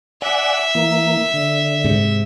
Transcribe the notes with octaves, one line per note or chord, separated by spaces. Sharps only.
D5 E5 F#5 G#5
E3 A#3
D3
G#2 C3